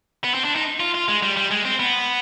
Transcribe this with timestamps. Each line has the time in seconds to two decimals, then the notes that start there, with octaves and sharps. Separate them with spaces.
0.24 B3
0.34 C4
0.45 D4
0.56 D#4
0.80 F4
0.94 F4
1.08 G#3
1.23 G3
1.37 G3
1.51 G#3
1.65 C4
1.80 B3